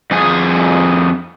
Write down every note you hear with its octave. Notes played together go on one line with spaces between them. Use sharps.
F2 G#4